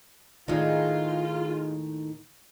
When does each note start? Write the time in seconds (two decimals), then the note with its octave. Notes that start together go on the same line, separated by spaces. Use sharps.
0.48 D#2 A2 D#3 G#3 D#4 F4